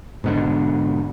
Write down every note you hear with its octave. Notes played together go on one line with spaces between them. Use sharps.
G#2 B2 D3